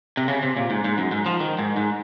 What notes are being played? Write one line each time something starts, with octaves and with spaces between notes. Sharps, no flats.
C3
C#3
C3
A#2
G#2
G#2
F#2
G#2
F3
D#3
G#2
G#2